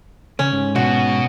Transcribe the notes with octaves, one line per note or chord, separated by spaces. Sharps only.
C#3 C#4
G#2
B2 F#4